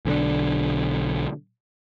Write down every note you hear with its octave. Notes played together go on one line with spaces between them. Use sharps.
B1 D3 C4 D4